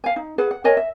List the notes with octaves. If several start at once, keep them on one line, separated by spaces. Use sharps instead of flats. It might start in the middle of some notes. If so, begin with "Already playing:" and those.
F5 G#5
D#4
G#4 B4 F#5
F#5
A#4 C#5 D#5 G#5
E5